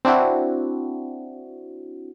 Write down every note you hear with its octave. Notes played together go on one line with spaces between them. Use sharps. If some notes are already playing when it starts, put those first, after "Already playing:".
C4 D4 E4 F#4